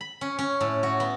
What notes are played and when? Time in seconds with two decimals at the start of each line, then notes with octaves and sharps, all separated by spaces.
0.01 B5
0.21 C#4
0.39 C#4
0.61 A2
0.83 F#4
1.00 B3